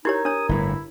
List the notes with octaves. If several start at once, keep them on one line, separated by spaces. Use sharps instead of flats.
D#4 E4 G4 A#4 C#5 A#5 G#6
D4 C#5 D#6
G1 A2 E4